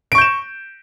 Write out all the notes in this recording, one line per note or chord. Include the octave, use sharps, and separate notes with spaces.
C#6 G6 D7 E7